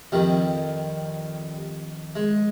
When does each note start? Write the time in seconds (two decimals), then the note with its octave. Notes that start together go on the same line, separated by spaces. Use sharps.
0.12 F2 D#3 G3
2.16 G#3